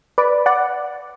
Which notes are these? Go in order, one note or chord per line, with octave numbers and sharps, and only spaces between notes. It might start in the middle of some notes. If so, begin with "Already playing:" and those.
B4 D5
D5 F#5